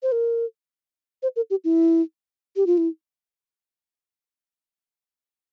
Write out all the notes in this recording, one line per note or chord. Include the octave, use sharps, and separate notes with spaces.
C5
A#4
C5
A#4
G4
E4
G4
F4
E4